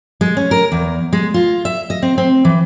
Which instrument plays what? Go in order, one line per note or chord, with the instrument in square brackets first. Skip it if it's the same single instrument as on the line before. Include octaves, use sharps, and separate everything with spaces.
[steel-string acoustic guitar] G#3
C#4
A#4
E2
G#3
F4
E5
D#5
C4
C4
E3